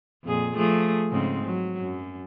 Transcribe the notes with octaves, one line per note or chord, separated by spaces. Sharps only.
F2 A#2 G#4
F3 A3 G#4
G#2 C#3 C4
F#3
F#2